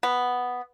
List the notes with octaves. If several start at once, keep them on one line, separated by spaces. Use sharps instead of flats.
B3